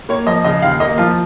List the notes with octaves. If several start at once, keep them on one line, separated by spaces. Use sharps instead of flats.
A#3 C#5
F3 D#5
C#3 D#5
D#2 F5
A#3 D#5
F3 F4